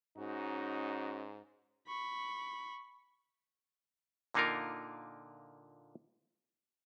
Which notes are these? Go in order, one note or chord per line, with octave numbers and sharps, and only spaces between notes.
G#2 C#4 D#4 F#4
B5 C#6
A#2 D3 A#3 D#4 F4 A#4